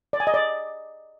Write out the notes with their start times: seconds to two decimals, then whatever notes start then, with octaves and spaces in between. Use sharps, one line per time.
0.13 D5
0.20 G#5
0.27 D#5
0.34 D5